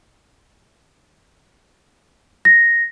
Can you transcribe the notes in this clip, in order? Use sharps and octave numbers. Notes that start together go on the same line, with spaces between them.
A#6